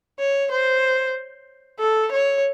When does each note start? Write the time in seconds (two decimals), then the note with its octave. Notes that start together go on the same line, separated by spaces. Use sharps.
0.19 C#5
0.52 C5
1.79 A4
2.12 C#5